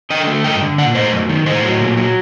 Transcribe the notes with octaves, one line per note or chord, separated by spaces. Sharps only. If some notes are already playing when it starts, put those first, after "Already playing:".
D3 D#5 G5
A3
G2 D#5 G5
D3
A#2 D5 F#5
A3 C5 D#5
F#2
D#3
A2 C5 D#5
F#3
A#2
F#3